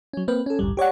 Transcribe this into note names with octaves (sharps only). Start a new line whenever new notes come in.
F#3 C#4
A#3 C4 B4
C#4 A4
A1 D2 G2 G3
G4 C#5 D5 F#5